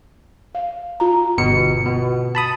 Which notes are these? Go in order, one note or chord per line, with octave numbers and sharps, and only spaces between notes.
F5
F4 A#5
G1 B2 C#7
B2 B3
A5 B5 D#6